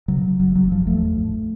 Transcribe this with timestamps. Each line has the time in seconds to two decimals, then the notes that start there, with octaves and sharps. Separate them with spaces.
0.08 C#3 F#3
0.24 C#3
0.39 F#1 F#3
0.55 F#1 F#3
0.71 F#1 F3
0.87 E2 A3
1.02 A1
1.18 G#2